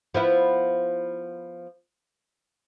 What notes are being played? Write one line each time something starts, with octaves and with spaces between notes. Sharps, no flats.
F3 B3 E4